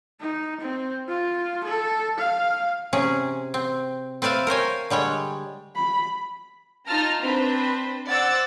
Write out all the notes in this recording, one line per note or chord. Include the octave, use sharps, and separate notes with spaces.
D#4
C4
F4
A4
F5
C3 C#4 G#4
C4
C4 B4 D5 E5 F5
A#4 C5 C#5 G#5
D3 G3 G#3 C#5
B5
D#4 F4 A5 A#5 F6
C4 D4 B4 C5 B5
C5 D5 F#5 D6 E6 A6